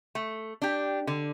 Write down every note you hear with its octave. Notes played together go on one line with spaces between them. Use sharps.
A3
D4 G4
D3